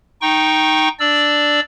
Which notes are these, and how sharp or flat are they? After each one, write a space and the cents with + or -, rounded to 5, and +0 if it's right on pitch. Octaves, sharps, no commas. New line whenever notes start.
D#4 +0 G5 +0 C#6 -10
D4 +0 D5 +0 E6 +0